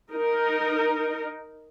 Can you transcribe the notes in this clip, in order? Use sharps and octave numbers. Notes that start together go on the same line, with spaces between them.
D#4 A#4